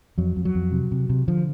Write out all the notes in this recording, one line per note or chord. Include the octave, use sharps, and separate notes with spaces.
F2 F#3
F2
F#3
F2
C3
C3
C3
D3 F3